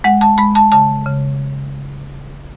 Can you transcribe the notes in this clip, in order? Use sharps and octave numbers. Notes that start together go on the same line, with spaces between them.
G#3 F#5
A5
G#3 B5
A5
C#3 A5
C#3